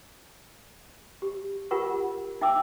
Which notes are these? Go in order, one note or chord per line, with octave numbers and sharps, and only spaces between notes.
G4
F4 G4 A#4 F#5 C#6
F#5
D#4 E5 G5 D6 E6